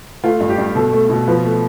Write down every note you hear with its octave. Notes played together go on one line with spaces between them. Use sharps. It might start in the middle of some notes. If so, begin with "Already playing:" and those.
A3 F4
G2
G4
G2
B2 A4
A3
B2
F3 B4
A3